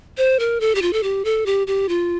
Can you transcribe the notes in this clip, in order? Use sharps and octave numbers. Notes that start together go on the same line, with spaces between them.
C5
A#4
A4
G4
F4
A4
G4
A4
G4
G4
F4